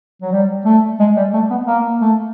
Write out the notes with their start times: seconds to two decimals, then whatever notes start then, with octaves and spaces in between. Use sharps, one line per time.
0.22 F#3
0.32 G3
0.65 A3
1.00 G#3
1.17 G3
1.33 A3
1.50 B3
1.67 A#3
2.01 A3